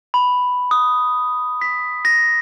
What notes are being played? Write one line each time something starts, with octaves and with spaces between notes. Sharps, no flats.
B5
D#6
B6
A#6